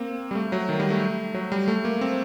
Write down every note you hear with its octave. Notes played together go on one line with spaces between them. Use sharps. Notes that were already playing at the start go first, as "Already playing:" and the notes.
Already playing: A#3 C4
G3
A3
F#3
D#3
G3
A3
F#3
G3
A3
A#3
C4